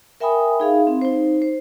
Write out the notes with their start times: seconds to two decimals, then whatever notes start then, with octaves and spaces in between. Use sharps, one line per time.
0.20 A#4 E5 G5 G#5 B5 D#6
0.60 D#4 G#4 F5
0.87 C4
1.01 D#4 C5
1.42 C5